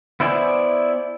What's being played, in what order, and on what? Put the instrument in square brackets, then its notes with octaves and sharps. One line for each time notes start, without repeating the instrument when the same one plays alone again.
[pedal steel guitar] B3 E4 C5 D5 G#5